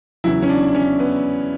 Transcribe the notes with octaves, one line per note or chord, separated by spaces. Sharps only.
E2 C#3 F#3 E4
C#4
D4
C#4
B3